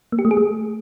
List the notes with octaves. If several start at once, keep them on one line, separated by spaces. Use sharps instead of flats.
A#3
G4
A3
G#4
A3